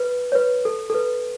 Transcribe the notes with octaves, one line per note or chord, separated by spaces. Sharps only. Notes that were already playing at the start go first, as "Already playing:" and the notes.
Already playing: B4
C#5
B4
A4
A4
B4